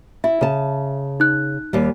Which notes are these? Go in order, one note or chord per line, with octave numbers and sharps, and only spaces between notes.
E4 E5
C#3 A5
D#4 F#6
D#2 G3